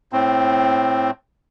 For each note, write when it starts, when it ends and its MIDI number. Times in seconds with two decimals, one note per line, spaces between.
0.13 1.11 45
0.13 1.11 60